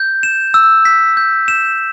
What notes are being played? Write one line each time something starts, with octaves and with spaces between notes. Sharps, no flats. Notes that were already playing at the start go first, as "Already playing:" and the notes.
Already playing: G6
E7
E6
B6
G6
E7